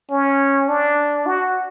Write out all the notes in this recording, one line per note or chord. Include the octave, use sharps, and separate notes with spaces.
C#4
D4
F#4